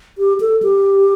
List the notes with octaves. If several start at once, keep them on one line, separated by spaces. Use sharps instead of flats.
G4
A4
G4